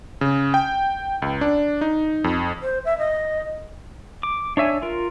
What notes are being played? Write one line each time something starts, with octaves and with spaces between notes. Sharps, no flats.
C#3
G5
C#2
D4
D#4
F2
C5
E5
D#5
D6
D4 C#5 E5 G#5
F4 A#4